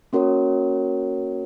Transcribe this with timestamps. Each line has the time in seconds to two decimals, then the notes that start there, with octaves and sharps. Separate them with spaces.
0.13 A#3 C#4 F#4 A#4 C#5